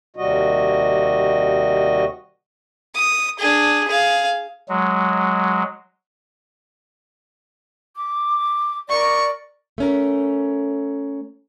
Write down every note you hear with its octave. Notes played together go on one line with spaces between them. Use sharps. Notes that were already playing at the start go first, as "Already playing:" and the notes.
D#2 C3 G3 F#4 D#5
D#6
D4 G#4
G#4 F5
F#3 G#3
D6
A#4 D5 C#6
A3 C#4 A#4